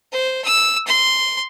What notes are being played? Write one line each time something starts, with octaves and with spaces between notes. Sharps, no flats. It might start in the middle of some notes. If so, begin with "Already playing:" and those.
C5
E6
C6